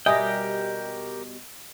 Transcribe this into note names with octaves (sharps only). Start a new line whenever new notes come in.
B2 G3 G4 A#4 D#5 E5 G5 G#5